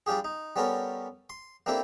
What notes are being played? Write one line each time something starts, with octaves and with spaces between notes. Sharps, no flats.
G3 D4 F4 G4 G#4
D#4
G3 B3 C#4 A4 A#4
C6
A#3 C4 D4 E4 G4 A4